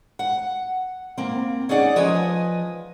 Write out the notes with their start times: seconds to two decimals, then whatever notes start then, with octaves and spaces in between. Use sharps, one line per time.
0.19 F#5
1.18 A#3 C4
1.69 C#4 D#4 G#4 D5 F#5
1.96 F3 B4 D#5 G#5